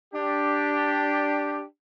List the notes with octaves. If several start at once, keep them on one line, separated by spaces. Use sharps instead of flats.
D4 G4